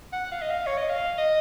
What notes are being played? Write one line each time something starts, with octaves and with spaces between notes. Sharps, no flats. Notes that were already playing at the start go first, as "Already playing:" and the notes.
F#5
F5
D#5
F5
C#5
D#5
F5
D#5